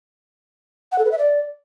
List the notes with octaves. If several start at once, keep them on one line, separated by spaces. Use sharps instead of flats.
F#5
A4
B4
E5
D5